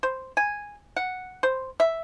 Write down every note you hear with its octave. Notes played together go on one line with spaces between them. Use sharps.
C5
G#5
F#5
C5
E5